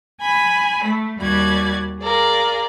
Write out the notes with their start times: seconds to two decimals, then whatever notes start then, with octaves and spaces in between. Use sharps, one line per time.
0.20 G#5 B5
0.86 A3
1.18 D#2 G3 F#4 D5 G#6
2.00 G#4 A#4 D5 F5